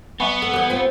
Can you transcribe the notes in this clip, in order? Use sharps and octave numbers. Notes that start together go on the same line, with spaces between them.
F#3 B3 E5 F#5 G#5 B5 C#6
A4 F#5
E3 G3 G4 A4 C5 F#5
C4 F4 C#5